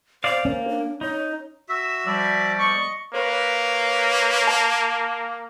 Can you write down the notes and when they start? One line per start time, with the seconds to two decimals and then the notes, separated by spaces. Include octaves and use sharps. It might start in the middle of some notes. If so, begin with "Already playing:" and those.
0.24 C5 D5 F5
0.45 A#3 C#4
0.69 D4
1.01 D#4 C#5
1.69 F#4 E5 E6
2.06 F3 G3 D5
2.59 D#5 C#6
3.14 A#3 B4 C#5
4.48 A5